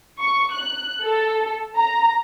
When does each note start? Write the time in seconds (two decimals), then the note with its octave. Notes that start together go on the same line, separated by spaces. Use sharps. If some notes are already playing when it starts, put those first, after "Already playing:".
0.20 C#6
0.53 F#6
1.03 A4
1.75 A#5